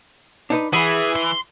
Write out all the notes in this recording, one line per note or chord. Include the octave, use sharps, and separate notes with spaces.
D4 D#4 B4
E3 G#4 F#5 B5
C6